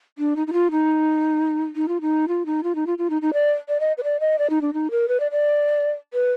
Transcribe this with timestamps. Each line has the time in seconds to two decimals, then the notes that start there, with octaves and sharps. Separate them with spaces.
0.18 D4
0.36 D#4
0.47 D#4
0.53 F4
0.71 D#4
1.76 D#4
1.88 F4
2.01 D#4
2.28 F4
2.46 D#4
2.63 F4
2.75 D#4
2.87 F4
2.98 F4
3.10 D#4
3.22 D#4
3.33 D5
3.69 D5
3.80 D#5
3.98 B4
4.04 D5
4.20 D#5
4.39 D5
4.50 D#4
4.61 D4
4.74 D#4
4.91 A#4
5.08 B4
5.20 D5
5.31 D5
6.14 B4